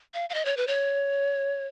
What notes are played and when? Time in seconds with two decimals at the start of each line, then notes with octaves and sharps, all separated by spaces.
0.14 F5
0.30 F5
0.34 D#5
0.45 C#5
0.57 B4
0.67 C#5